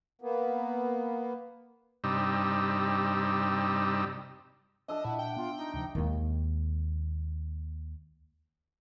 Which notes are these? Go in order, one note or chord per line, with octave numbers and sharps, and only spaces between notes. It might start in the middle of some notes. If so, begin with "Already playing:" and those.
A#3 B3
G2 C3 G3 D#4 E6
D4 D#5 E5 A5
A#2 E4 F#5
G5
B3 F4
D#4
D2 C3 F3
D#2 G#3